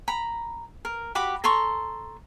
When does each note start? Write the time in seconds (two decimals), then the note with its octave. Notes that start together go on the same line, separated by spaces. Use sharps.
0.08 A#5 B5
0.85 A#4
1.15 F#4 G4 B5 D6
1.44 A4 A#5 C6 C#6